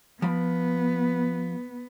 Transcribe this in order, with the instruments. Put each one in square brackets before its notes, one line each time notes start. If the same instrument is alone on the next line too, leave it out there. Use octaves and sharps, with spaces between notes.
[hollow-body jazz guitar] F3 B5 [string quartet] B3